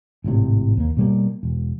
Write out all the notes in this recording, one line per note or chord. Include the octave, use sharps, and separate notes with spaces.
G#1 A2 C3
D#2 A#3
B2 G3 A#3
E1